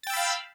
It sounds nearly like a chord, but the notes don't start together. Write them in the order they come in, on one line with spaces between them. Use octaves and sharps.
A6 G5 E6 B5 F5